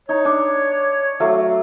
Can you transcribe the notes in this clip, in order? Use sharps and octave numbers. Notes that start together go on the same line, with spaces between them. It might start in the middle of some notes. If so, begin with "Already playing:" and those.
D#4 C#5
D4
F#3 A3 F5